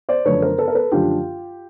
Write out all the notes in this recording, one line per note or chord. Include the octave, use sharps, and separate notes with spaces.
C5 D5
F#2 D3 F3 A3 D4 B4 C#5
A#4 C5
A4 B4
A#4
A4 B4
F#2 D3 F3 A3 D4 F4 G4